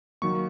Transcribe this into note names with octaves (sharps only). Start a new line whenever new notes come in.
D#3 F#3 A#3 C#6